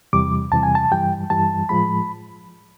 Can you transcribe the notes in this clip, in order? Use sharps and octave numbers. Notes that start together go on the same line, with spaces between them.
E2 C3 E3 G3 D6
E2 C3 E3 G3 A5
G#5
A5
G2 E3 G3 G5
G2 E3 G3 A5
A2 F3 G#3 B5